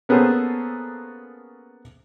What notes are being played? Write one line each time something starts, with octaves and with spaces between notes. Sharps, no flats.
A#3 B3 C#4 G#4 A4 C5